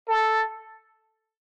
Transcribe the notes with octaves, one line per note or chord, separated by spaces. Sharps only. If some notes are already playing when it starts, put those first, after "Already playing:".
A4